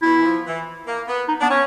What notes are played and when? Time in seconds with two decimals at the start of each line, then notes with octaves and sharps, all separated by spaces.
0.02 B2 E4
0.19 E3
0.23 F3
0.45 E3
0.86 A#3
1.07 B3
1.28 D#4
1.40 B3 D4
1.48 C#4